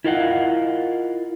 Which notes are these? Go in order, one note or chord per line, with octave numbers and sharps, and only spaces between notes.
E4 F4 A#4 D#5 F5 F#5